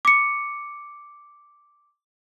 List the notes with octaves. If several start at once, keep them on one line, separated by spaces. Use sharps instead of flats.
D6 C#7